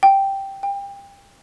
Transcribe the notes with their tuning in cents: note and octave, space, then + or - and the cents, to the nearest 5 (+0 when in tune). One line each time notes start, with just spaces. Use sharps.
G5 +0
G5 +30